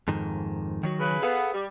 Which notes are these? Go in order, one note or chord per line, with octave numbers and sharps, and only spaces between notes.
F2 G#2 D#3
D#3 F#3 F#4
C#3 B4
B3 G#4 A4 F5
G3